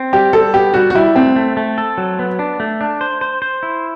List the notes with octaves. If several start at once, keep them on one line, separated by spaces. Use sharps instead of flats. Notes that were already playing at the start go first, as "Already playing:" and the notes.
Already playing: C4
G3 G4
G3 A4
B3 G4
G3 F#4
F#4
G3 E4
A3 C4
A3
A3
A4
F#3
B3
D4
A3
D4
C5
C5
C5
E4